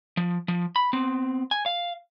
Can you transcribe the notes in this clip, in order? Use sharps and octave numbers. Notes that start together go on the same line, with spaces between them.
F3
F3
B5
B3 C4
G#5
F5